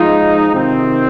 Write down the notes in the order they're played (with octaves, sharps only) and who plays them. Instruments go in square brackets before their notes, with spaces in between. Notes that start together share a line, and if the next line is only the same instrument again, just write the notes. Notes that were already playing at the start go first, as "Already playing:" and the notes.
Already playing: [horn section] F3 G#3 D#4 [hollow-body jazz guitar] F4
[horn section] C3 D#3 C4